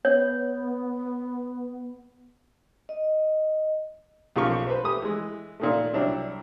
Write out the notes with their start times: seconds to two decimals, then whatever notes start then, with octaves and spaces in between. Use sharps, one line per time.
0.05 B3 C#5
2.89 D#5
4.36 B1 C#3 F3 A#3 G4 C#6
4.66 B4 C5
4.84 A3 G4 D#6
5.02 E3 G#3
5.60 A#2 D#3 A3
5.94 C2 F#3 D4 E4